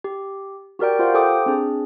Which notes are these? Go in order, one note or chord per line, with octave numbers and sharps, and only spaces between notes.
G4
F#4 G4 A#4 D5 G5
F4 G4 C5 F5 F#5
G4 A4 C5 G5 D6 D#6
C4 D4 G#4